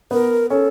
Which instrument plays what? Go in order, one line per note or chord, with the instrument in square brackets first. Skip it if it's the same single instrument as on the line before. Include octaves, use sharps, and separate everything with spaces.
[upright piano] B3 [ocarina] A#4
[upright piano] C#4 [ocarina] A4